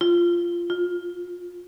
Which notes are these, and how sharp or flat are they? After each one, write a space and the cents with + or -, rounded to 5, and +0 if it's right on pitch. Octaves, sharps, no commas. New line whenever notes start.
F4 -15
F4 +25